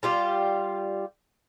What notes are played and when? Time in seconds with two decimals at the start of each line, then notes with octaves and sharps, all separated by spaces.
0.03 G3 F4 G4